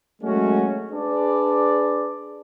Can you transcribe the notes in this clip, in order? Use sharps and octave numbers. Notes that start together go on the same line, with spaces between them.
F#3 G#3 A3 C#4 F#4
D4 G#4 B4 D5